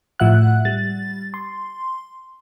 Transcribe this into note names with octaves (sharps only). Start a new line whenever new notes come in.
A2 F3 E5 F#5 F#6
G3 A6
C6